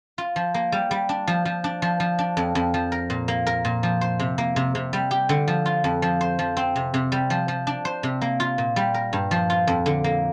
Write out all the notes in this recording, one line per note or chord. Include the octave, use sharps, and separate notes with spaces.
F4
F3
A#3
G3
G3
D4
F3
F3
D4
F3
F3
D4
F2
F2
F3
A#4
A#2
A#3
A#4
A#2
F3
C5
C3
A#3
C3
C3
G3
G4
D3
F3
F4
F2
F3
C5
F3
C4
C3
C3
G3
F3
F3
D4
C5
C3
A#3
F4
A#2
G3
A#4
G2
F3
F4
F2
D3
A#3